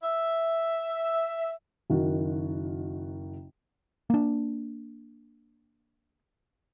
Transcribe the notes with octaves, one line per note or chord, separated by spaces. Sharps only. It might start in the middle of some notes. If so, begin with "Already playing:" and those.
E5
F#1 D#3 F#4
A#3 D4